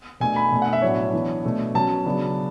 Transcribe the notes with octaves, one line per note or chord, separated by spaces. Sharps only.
B2 A3 D4 G#5
B5
B2 A3 D4
F#5
E5
A2 F#3 B3 D4 C#5
E3 B3 D4
B2 A3 D4
B2 F#3 C#4 A5
C#3 F#3 B3 D4